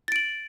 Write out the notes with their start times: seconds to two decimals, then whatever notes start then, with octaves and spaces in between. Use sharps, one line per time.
0.08 A6
0.12 D7
0.16 F#7